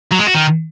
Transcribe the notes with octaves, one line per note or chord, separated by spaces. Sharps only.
F#3
G#3
F#4
D#3